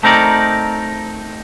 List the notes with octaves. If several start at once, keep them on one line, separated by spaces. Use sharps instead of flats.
A3 C4 D#4 A#4 D5